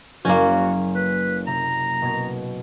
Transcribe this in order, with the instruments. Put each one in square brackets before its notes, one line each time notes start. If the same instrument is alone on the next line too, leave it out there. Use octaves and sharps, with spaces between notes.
[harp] F#1 [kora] A#3 C#4 [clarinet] F#4
[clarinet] B4
[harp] C3 [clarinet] A#5
[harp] B2 G#6